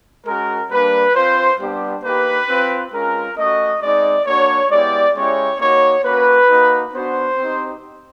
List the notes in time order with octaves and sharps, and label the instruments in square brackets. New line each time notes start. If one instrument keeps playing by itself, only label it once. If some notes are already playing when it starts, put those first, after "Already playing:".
[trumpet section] G#3 C#4 F#4 A#4
G3 A#3 D4 B4
C4 F4 C5
G3 B3 D4 G4
A#3 D#4 G4 B4
C4 F4
G#3 C#4 F4 A#4
A3 C#4 F#4 D#5
G#3 C4 D#4 D5
A#3 D4 F#4 C#5
G#3 B3 E4 G4 D5
G#3 C#4 E4 G4 C#5
A#3 D#4 F#4 C#5
A#3 C#4 F#4 B4
A#3 D#4 F#4
B3 D4 F#4 C5
C4 D#4 G4